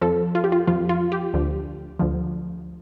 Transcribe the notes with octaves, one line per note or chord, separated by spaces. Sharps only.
F2 F3 A4
F4
G4
F4
F2 F3 F4
F4
G4
D2 D3 F3
D2 D3 F3